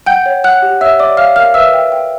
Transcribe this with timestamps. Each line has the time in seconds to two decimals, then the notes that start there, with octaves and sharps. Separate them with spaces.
0.06 F#5 G5 G6
0.26 C#5
0.44 F#5 F#6
0.62 G4
0.81 C#5 E5 E6
0.99 C#5 D5 D6
1.17 C#5 F5 F6
1.36 A#4 F5 F6
1.54 B4 E5 E6
1.74 G5
1.92 G5